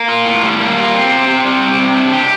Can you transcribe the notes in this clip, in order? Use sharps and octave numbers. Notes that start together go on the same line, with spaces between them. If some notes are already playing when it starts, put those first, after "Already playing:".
Already playing: A#3
F4
A2
G3
A#3
F4
C4
C3
C3
G3
C4
C3
D4
G4